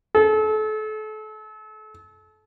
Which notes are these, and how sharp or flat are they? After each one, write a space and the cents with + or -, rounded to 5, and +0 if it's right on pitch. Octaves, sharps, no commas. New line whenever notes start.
A4 -35